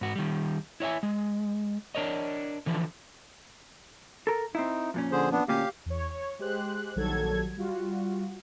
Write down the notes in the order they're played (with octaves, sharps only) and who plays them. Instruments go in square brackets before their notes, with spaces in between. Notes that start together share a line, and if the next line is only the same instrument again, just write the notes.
[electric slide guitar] G#2 F#4
D#3 G3
E4 C#5 E5 G#5
G#3
D4 A#4 C#5 D#5
D3 E3 F3 D4
[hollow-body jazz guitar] A4 A#4
[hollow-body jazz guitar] C4 E4 [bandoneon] D#4
[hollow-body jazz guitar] F2 A#2 C#4
[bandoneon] D3 G#4 C5
B3 D4
[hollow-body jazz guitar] D2 A#2 C#4 [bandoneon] G4 F5
[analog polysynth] E2 C#5
C#5
G#3 G4 C5 F#6
A#1 D#3 F#3 G3 A4 G#6
G3 F4 F#4